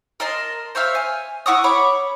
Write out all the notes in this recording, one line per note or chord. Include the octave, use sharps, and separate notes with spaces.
A#4 D#5 A5 C6
C5 C#5 E5 F5
G#5
E4 F#5 C#6 D#6
C#5 B5 C#6 D6